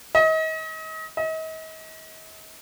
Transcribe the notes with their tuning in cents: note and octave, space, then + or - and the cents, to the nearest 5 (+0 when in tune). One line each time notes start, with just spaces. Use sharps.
D#5 +35
D#5 +40